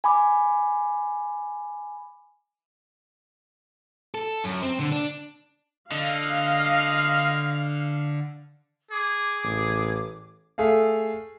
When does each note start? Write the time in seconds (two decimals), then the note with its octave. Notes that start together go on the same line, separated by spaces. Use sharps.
0.04 G#5 B5 D6
4.14 A4
4.44 F#2
4.62 C4
4.80 D3
4.92 D4
5.92 D3 D#5 F5
8.91 G#4 D6
9.44 A1
10.58 A3 G#4 A4 F5